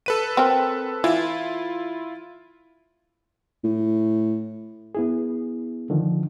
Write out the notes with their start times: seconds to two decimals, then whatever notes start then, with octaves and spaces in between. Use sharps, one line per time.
0.06 A4 B4 D#7
0.37 C4 A#4
1.04 E3 E4 F4
3.64 A2
4.95 B3 E4 G#4
5.90 D3 D#3 F3